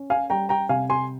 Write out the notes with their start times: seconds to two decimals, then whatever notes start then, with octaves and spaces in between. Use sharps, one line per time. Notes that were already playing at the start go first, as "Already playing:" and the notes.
Already playing: C#4
0.10 F5 G#5
0.30 G3 G5 A#5
0.49 G5 A#5
0.69 C3 F5 G#5
0.90 G#5 C6